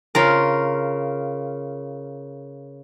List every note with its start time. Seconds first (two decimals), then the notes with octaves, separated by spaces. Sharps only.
0.15 C#3 F4 A#4